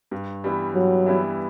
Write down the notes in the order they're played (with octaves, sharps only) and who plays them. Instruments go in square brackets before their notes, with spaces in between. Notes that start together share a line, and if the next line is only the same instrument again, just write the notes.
[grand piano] G2
E3 G3 B3 E4
[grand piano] G2 [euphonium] F#3
[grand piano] E3 G3 B3 E4